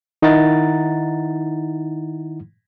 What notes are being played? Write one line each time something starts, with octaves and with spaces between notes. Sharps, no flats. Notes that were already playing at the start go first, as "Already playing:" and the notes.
D#3 D#4 E4 F#5 A#5 A6